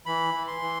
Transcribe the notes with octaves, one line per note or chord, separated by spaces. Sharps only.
E3 B5
E3
C6
E3